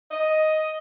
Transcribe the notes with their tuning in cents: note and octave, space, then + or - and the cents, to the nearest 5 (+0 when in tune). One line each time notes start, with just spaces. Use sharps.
D#5 +5